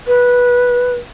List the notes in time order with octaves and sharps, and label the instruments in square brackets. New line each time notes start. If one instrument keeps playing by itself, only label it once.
[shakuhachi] B4